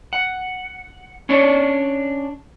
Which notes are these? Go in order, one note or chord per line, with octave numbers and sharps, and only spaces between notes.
F#5
C#4 D4 C#5 D5